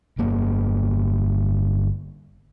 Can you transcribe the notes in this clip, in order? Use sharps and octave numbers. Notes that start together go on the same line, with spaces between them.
G1 A#3